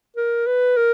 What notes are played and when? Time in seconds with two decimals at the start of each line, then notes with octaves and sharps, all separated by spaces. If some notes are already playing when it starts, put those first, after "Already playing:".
0.17 A#4
0.47 B4
0.77 A#4